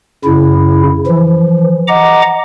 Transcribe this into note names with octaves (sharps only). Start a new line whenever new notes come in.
F#2 C#3 E4
E3 F3
D#5 F#5 A#5 D6